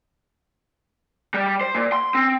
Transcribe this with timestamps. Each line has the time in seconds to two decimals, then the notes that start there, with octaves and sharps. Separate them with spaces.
1.34 G3
1.61 C5
1.75 A#2
1.92 C6
2.15 C4